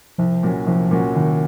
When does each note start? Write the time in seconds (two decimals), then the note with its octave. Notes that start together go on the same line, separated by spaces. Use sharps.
0.18 C2 F3
0.43 A#2 F#3 C#4 F#4
0.67 C2 F3
0.91 A#2 F#3 C#4 F#4
1.15 C2 D#3